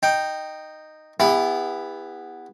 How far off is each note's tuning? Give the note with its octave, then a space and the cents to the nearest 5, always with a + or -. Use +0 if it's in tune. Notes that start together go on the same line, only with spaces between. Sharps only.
D#4 -10 G5 +0
B3 +0 E4 +0 G4 +45